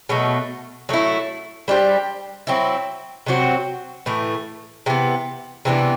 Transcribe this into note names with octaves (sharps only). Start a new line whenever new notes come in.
B2 F#3 A3
F#3 A3 E4
G3 D4 G4 C5
F#3 C4 E4
C3 F#3 C4 F#4
A2 E3 A3
C3 E3 B3
C3 E3 B3 D4